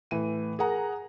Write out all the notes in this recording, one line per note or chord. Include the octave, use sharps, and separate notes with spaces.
A2 E3 D#7
G#4 A#4 F#5 A#5